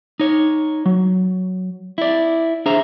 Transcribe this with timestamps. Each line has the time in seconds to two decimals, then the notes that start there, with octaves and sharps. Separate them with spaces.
0.20 D#4 C#5
0.86 F#3
1.98 E4 D5
2.66 D4 G#4 C5 E5 A#5